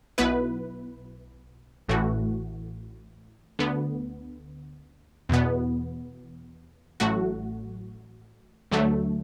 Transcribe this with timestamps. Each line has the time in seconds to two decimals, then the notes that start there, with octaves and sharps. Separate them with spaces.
0.18 B1 B2 B3 E4 B4
1.88 A1 A2 E3 A3 F#4
3.59 D2 D3 B3
5.29 E2 B2 B3
7.00 A1 A2 F#3 A3 F#4
8.71 D2 D3 F#3 A3